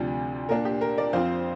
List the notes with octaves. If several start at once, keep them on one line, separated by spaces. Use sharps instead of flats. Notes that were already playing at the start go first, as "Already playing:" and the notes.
Already playing: D2 C3 F3 D4
A#2 A#3 D4 A#4
G4
A#4
A#4 D5
F2 F3 C4 C5 F5